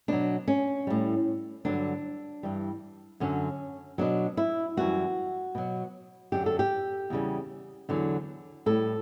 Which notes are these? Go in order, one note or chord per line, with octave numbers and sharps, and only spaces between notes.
B2 F#3 D4
C#4
A2 G3
G2 D3 F#3 D4
G2 E3 G3
F#2 D3 F#3 C#4
B2 F#3 D4
E4
F#2 E3 G3 F#4
B2 F#3
F#2 D3 F#3 G4
A4
G4
E2 C#3 G3
E2 D3 F#3
A2 G3 A4